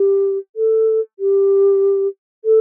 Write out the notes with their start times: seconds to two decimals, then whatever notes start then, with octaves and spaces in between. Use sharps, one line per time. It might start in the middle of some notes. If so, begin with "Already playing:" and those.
Already playing: G4
0.56 A4
1.19 G4
2.45 A4